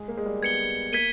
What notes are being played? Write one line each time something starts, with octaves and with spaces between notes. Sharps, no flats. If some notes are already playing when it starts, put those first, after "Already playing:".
Already playing: G#3
A#3
G#3
G3
B3 G#6 C#7 G7
A#3 G#6 B6 D#7 G7